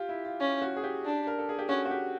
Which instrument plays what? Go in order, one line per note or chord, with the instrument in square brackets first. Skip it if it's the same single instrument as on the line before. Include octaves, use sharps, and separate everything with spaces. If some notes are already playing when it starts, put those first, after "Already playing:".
Already playing: [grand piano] F4 G4
E4
F4
[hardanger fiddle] C#4 [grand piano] F4
[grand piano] F#4
G#4
G4
[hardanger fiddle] D4
[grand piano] A#4
A4
G#4
G4
[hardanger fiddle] C#4 [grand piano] F#4
[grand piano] F#4
G4